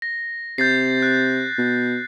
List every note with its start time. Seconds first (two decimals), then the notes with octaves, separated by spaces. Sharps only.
0.02 A#6
0.58 C3 G6 A6 C7
1.03 F#6
1.58 B2